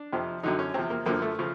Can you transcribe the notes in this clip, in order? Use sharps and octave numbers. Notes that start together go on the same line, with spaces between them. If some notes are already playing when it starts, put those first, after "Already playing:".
Already playing: D4
F2 C3 F3
F#2 D3 F#3 D#4
C#4
E2 C3 F3 C4
A#3
F#2 D3 F3 A#3
A3
C#3 F3